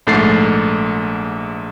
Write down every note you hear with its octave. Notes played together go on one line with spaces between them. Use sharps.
A#1 G#2 A3 A6 C7